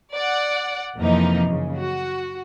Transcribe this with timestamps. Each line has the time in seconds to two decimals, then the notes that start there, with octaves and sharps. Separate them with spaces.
0.13 D5 F#5
0.97 F2 C3 E3 F3 A#3 D#4
1.49 F#2 C#3
1.79 F#4